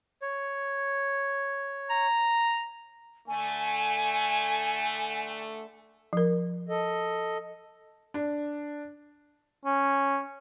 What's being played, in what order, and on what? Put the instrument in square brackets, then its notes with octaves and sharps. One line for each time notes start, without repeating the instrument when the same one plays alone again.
[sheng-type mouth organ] C#5
[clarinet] A#5
[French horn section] D3 A3 [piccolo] G#5
[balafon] F3 A#4
[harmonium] A4 D#5
[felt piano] D4
[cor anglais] C#4